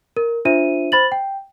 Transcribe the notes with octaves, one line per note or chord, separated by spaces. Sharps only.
A#4
D4 F4 C5 E5 D#7
C5 B5 A6 F#7
G5